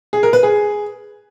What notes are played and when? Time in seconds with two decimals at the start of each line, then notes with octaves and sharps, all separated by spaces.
0.13 G#4
0.23 A#4
0.33 B4
0.43 G#4